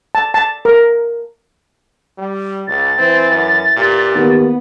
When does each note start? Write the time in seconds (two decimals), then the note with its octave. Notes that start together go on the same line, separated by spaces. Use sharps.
0.15 A5
0.34 A5
0.65 A#4
2.18 G3
2.67 C#2 A6
2.98 E3 C4
3.31 F#2
3.77 A#2 G4
4.15 D#2 B3